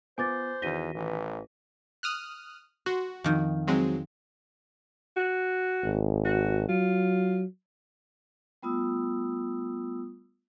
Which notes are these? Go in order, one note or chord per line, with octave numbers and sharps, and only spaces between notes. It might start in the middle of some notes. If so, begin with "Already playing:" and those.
B3 F4 B4 C5 G#5 D6 A6
E2 D#3 F#4 A#6 B6 D#7 G7
A1 E3
D#6 F6 F#6
F#4 C6
F2 D#3
F#3 G#3 C4
F#4
G#1
F#4
F#3 F4
G3 A3 B3 F4 D#6 E6